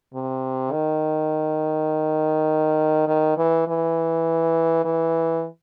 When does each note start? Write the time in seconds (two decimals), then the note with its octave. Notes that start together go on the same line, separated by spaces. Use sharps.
0.14 C3
0.72 D#3
3.08 D#3
3.38 E3
3.68 E3
4.85 E3